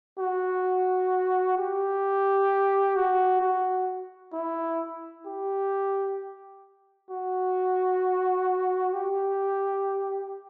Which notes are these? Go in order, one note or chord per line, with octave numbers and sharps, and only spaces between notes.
F#4
G4
F#4
F#4
E4
G4
F#4
G4